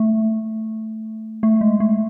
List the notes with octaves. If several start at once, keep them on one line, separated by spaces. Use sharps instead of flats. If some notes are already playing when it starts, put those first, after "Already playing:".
Already playing: A3
A3
G#3
A3